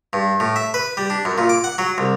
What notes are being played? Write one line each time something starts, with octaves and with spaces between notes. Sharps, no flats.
G2
A2
E5
B4
G3
D4
F#2
A#2
D6
F#5
F#3
C2